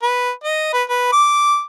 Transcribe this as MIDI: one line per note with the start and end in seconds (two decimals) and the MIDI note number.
0.03 0.30 71
0.44 0.71 75
0.73 0.83 71
0.90 1.10 71
1.12 1.63 86